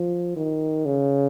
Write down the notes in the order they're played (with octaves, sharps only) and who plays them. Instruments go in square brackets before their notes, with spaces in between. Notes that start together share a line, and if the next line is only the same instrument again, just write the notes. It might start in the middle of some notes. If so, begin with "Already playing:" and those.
Already playing: [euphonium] F3
D#3
C#3